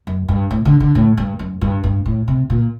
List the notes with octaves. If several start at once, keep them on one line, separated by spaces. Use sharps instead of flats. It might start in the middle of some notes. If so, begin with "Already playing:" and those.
F#2
G2
A2
D3
D3
A2
G2
F#2
G2
G2
A2
C3
A#2